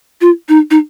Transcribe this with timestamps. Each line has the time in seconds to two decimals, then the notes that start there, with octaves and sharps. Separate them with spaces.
0.21 F4
0.49 D#4
0.71 D#4